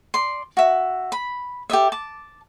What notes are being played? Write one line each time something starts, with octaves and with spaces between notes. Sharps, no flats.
D5 C6
F#4 E5
B5
G4 A4 D#5 E5
A5 D6